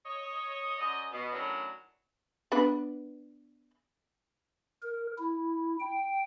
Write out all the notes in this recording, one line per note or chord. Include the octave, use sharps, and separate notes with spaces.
C#5 D#5
F#2 D5 D#5
B2
A2 D#3 F#3 C#4 D4
B3 D4 B4
A#4
E4
G5